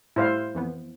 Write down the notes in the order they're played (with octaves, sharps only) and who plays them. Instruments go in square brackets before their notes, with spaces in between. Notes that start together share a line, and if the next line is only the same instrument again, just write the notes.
[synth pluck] A2 G3 A3 [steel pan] E4 C5 F5
[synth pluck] F2 E3 B3